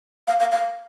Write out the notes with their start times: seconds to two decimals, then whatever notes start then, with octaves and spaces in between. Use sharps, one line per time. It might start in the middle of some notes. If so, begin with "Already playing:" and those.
0.27 F5
0.40 F5
0.52 F5